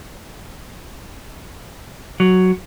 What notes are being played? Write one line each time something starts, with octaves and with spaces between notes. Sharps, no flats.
F#3